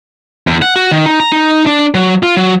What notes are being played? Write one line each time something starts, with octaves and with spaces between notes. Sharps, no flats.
E2
F#5
F#4
D#3
D#4
A#5
D#4
D4
F#3
F4
F#3